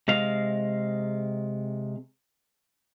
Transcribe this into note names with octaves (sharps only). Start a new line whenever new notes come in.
C3 G#3 F5